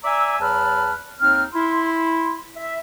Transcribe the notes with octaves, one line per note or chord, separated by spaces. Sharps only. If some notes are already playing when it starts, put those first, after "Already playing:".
D5 E5 G#5 A#5 E6
E2 F#3 B4 A5 B5 F6
D#2 C4 D#4 F6
E4 C6
E5